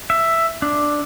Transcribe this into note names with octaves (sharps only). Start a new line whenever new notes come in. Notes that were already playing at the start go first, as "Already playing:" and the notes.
E5
D4